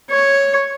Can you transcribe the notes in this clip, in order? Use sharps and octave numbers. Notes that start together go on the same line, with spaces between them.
C#5